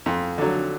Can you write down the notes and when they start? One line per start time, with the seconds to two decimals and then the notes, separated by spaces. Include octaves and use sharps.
0.06 F2
0.38 D3 F#3